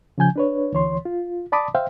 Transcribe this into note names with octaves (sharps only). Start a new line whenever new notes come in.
C#3 F3 G#5 G6
D4 B4 C#5
D2 E3 C#5 C6
F4
D5 A5 B5 D6 D#6
C5 E5 F5 G5